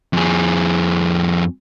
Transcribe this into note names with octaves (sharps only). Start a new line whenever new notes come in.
F2 G#4